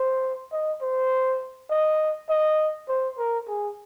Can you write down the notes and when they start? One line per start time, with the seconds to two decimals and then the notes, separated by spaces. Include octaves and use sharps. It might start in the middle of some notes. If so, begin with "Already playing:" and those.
Already playing: C5
0.52 D#5
0.81 C5
1.70 D#5
2.29 D#5
2.89 C5
3.18 A#4
3.48 G#4